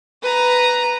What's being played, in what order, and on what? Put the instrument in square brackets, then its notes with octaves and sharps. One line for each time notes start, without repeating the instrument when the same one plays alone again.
[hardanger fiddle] B4 A#5